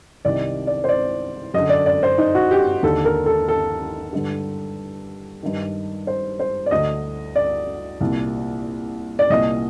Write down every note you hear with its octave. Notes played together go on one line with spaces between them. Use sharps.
C2 C3 D#3 D5
D5
C5
D5
F#2 D3 D#5
D5
D5
C5
D#4
F#4
G4
D#2 D3 A4
A#4
A4
A4
G2 D3
G2 D#3
C5
C5
D5
D2 D3 D#5
D5
C2 A#2
D5
C2 A#2 D#5